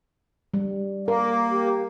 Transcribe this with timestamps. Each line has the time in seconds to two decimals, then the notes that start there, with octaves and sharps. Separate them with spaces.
0.54 G3
1.08 A#3 A#4
1.51 G4